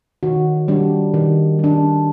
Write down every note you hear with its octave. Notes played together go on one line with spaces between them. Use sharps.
D#3 F#4
G3 D4
D#3
G3 D4